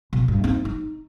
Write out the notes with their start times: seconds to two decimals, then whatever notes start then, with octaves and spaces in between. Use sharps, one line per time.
0.13 B2
0.28 G2
0.44 C4 D#4
0.65 D#4